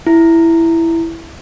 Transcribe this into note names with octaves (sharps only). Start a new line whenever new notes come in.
E4